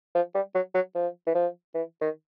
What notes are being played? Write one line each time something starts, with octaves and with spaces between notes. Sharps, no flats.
F3
G3
F#3
F#3
F3
E3
F3
E3
D#3